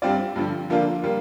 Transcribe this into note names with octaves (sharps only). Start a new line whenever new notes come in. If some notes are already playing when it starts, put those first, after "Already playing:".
G2 G3 C4 F4 D5
G2 D3 F3
D3 F3 A#3 D4 F4
G3 A#3 F4